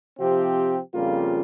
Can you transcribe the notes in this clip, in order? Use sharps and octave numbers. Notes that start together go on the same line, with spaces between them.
C3 F3 C4 G4
F2 C#3 G3 A#3 F4